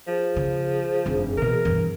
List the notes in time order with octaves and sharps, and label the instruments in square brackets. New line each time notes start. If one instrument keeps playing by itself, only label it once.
[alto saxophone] F3 [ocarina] G#4
[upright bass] C#3
F1 G2
[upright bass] B2 E3 [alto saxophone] A#4
[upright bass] E2 G2